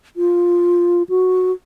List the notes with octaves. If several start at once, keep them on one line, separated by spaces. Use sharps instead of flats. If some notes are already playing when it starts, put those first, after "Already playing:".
F4
F#4